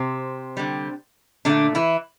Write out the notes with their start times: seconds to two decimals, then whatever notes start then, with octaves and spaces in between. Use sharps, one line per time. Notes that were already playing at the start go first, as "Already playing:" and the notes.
Already playing: C3 C4
0.57 D3 G3
1.45 A#2 D3 A3 D4
1.75 E3 E4